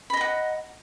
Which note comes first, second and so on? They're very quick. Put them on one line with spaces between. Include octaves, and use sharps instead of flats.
B5 D#5 A#5 F#5